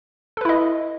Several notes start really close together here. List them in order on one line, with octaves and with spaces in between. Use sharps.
A4 B4 E4 D#5